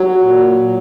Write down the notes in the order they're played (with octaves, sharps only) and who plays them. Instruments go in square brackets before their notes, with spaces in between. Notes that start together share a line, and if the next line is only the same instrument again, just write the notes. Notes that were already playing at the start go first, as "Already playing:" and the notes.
Already playing: [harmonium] F#3
A#2
A#2